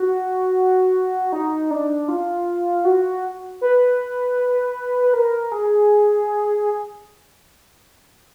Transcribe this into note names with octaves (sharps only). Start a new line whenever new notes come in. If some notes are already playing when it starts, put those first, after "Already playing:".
Already playing: F#4
D#4
D4
F4
F#4
B4
A#4
G#4